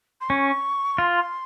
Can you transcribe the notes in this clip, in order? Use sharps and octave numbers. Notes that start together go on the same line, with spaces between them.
C6
C#4 C#6
F4 C6